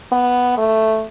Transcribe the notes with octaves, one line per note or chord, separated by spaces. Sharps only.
B3
A3